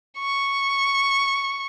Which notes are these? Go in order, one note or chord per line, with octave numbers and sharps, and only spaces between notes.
C#6